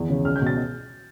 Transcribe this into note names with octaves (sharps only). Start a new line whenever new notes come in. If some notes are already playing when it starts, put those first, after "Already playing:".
Already playing: E2
C#3
C#2 F6
G6
B2 A6